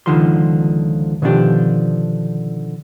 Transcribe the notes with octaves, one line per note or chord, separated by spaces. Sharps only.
C#2 D3 D#3 F3 B5 C6
B2 D3 D#3 F3 D4 G4